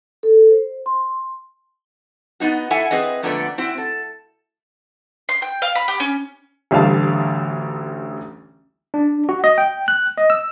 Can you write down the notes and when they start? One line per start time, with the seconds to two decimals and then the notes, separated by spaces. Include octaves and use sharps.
0.23 A4
0.51 C5
0.86 C6
2.40 B3 D#4 F#4
2.70 E4 A4 E5 F#5 G#5
2.90 C4 G#4 B4 D#5 G#5
3.23 F2 A#2 D3 A3 B3 D5
3.58 C4 E4 F#4
3.78 A4
5.29 C6
5.42 G5
5.62 F5
5.75 B5
5.88 G4
6.00 C#4
6.71 A1 D2 G3 F5 A5
8.94 D4
9.29 F#4
9.44 D#5
9.58 G5
9.88 F#6
10.17 D#5
10.30 E6